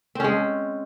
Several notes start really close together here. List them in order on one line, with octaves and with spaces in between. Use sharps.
C4 C#4 G#3